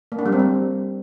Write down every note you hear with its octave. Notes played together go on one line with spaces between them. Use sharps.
A#3
D4
G3
C4
G3